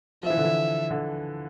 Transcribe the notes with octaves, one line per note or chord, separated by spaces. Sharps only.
F3 E5
E3
D3
E3
D3